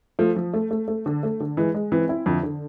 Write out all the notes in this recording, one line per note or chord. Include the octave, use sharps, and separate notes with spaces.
F3 A3
F3
A3
A3
A3
D3
A3
D3
E3 G#3
G#3
E3 C4
E4
F2 D3
D3